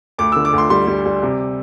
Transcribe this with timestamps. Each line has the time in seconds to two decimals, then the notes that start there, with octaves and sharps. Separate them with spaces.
0.19 D2 D6
0.32 E6
0.36 D3
0.45 D6
0.53 D2
0.58 C6
0.70 G3 C6
0.87 G3
1.06 G3
1.23 C3